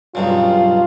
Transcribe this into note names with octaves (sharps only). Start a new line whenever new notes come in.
B1 G2 C#3 F4